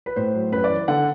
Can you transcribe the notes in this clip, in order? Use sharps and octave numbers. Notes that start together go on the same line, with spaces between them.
B4
A2 C5
F#3
F#2 B4
D5
E3
D3 F#5